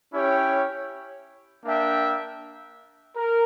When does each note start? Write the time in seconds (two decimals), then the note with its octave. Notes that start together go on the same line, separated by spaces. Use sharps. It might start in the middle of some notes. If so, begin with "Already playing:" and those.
0.14 C#4 E4 G4 C#5 G5
1.64 A#3 D4 A#4 E5 G5
3.15 A#4